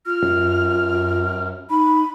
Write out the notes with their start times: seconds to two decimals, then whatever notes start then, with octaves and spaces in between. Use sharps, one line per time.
0.06 F4 F6
0.23 F#2
1.70 D#4 B5